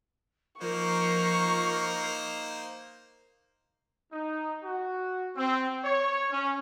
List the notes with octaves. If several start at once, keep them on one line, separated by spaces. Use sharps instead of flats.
F3 A#3 D#4 A#4 C5 C#6
D#4
F#4
C4
C#5
C#4